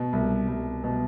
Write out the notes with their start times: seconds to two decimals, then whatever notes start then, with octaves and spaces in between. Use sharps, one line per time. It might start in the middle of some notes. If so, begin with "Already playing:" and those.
Already playing: B2
0.13 C2
0.48 C2
0.84 B2